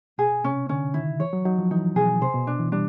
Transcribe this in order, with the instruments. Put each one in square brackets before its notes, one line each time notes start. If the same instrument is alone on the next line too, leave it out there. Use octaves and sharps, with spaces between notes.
[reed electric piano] B2 [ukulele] G#4
[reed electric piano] C3 [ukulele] C#4
[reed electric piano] D3 [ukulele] C#4
[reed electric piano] D#3 [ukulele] E4
[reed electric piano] E3 [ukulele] C#5
[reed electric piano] F#3
[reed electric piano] F#3 [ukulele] D#4
[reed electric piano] F3
[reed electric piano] E3 [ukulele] D#4
[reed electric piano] B2 [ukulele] G#4
[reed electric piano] C3 [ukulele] C5
[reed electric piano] B2
[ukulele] D4
[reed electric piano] E3
[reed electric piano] G3 [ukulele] D4